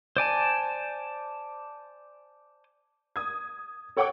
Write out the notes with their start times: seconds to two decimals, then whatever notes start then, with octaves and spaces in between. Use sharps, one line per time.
0.17 C5 D5 G#5 A5
3.16 D#6 G#6
3.97 A4 C#5 F#5 G5 C#6 D6